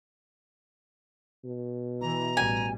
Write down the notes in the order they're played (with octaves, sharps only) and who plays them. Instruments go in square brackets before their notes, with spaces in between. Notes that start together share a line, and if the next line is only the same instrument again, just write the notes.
[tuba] B2
[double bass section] E3 [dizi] A#5
[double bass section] A1 G3 [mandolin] G#5